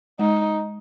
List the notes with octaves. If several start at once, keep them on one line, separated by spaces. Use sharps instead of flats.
G#3 D#4